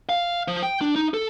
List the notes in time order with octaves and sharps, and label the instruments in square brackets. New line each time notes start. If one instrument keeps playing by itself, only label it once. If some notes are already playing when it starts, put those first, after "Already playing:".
[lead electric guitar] F5
F3
G5
D4
D#4
A4